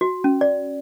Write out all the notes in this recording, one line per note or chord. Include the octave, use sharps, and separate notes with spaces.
F#4
C#4
D5